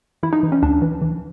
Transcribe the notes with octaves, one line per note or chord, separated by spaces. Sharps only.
E3 E4
D#4
E3
C#4
D2 D4
E3
E3